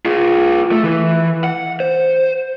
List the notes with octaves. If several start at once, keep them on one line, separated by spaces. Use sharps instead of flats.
F4 G#4
A3
E3
F#5
C5